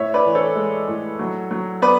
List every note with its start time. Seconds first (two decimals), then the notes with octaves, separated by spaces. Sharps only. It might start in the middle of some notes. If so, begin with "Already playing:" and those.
Already playing: A2 C#5 E5
0.14 B4 D5
0.25 E3
0.35 A4 C#5
0.56 G#3
0.88 A2
1.19 F#3
1.51 F#3
1.82 B3 B4 D5